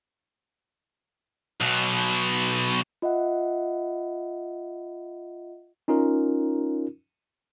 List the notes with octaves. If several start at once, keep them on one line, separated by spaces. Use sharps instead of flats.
B1 B2
F4 D#5 E5 F#5
C#4 D#4 F4 A#4